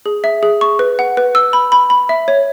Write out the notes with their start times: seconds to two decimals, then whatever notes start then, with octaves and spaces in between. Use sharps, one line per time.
0.06 G#4
0.24 E5
0.43 G#4
0.61 C#6
0.79 B4
0.99 F#5
1.17 B4
1.35 E6
1.53 B5
1.72 B5
1.90 B5
2.09 E5
2.28 C#5